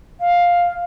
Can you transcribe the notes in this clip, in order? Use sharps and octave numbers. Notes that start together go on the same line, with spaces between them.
F5